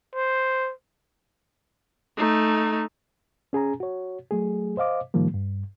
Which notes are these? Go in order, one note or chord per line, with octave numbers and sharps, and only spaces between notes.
C5
A3 D#4
C#4 G#4 G#5 A#5
F#4 C#5
F#3 A3 G#4
C5 D#5 F5 D6
A2 D#3 F3 G3 A#3
G2